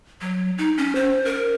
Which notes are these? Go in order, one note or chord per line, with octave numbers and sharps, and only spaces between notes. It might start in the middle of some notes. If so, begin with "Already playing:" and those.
F#3
D#4
C#4
C5
A#4